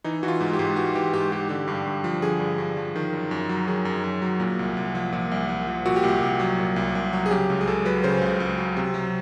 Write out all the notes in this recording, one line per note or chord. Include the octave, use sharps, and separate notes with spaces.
E3 D#4
E3 F#4
F4
G#2
G4
G#2
E3 F#4
E3 G4
G#2 G4
G#2 G4
D3 G4
G2
G4
G2
F3
D3 G#4
G2
G2
F3
D#3
F#2
F#2
F#3
D#3 G#4
F#2
F#2
F#3
A#2
C2
C2
F3
A#2
C2
C2
F3
A#2 F#4
G4
C2 F#4
C2
F#3
A#2
C2
C2
F#3
G#4
C#3 G4
C#2
G#4
C#2 A4
F#3 B4
C#3 C5
C#2
C#2
F#3
C3
F#3